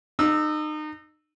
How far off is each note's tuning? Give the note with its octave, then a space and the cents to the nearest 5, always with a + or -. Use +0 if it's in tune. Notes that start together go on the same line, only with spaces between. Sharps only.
D#4 -30 E6 -5